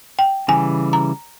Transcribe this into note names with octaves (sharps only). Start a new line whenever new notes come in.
G5
C#3 E3 G3 G#5
A#5